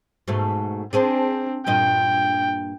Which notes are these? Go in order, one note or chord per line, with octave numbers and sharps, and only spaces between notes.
G#2 B2 A3
C4 D4 G#4 C5
G2 A#2 D#5 G5